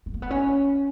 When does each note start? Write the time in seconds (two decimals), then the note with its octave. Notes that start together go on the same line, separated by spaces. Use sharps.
0.06 B3
0.14 A#3
0.22 B3
0.30 C#4